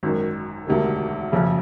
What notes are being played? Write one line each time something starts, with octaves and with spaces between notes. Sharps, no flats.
G#1 F#2 D#3
E1 D2 C3 D#3
F#1 F2 C#3